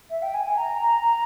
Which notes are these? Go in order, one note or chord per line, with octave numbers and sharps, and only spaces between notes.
E5
G5
G#5
G#5
A#5
A#5